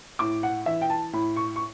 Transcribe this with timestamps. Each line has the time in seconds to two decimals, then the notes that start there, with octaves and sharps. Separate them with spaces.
0.19 A2 D6
0.43 F#5
0.66 E3 E5
0.81 G5
0.90 A5
1.13 A2 B5
1.36 C#6
1.56 C#6